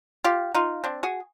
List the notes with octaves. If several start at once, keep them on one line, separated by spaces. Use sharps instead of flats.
F4 G4
D#4 F4
C4 D4
F#4 G#4